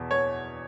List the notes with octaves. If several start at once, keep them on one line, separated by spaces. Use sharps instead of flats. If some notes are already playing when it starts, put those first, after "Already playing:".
Already playing: E2 B2
C#5